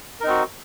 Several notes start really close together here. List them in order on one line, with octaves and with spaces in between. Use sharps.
A#4 D#4 C4 F#4